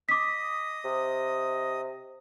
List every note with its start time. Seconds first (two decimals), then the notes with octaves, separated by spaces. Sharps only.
0.09 D#5 D6 D#6 B6
0.85 C3